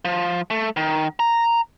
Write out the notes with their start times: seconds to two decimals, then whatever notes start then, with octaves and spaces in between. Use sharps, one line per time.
0.05 F3
0.50 A3
0.77 D#3
1.20 A#5